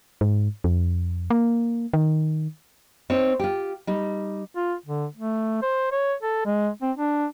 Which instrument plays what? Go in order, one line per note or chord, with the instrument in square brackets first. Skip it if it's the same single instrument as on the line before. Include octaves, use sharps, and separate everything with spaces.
[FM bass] G#2
F2
A#3
D#3
[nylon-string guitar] C4 D#4 C#5
F4 G4
G3 D#4
[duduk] F4
D3
A3
C5
C#5
A4
G#3
C4
D4